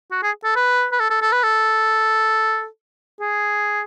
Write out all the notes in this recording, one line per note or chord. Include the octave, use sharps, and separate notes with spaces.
F#4
G#4
A4
B4
B4
A4
A4
A4
B4
A4
G#4